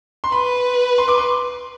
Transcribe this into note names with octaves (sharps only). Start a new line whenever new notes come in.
C6
B4 B5
C6
D6
C6